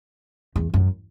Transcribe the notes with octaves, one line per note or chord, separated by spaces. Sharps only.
E2
F#2